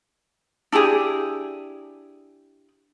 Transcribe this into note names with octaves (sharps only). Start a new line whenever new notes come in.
D4 E4 G4 G#4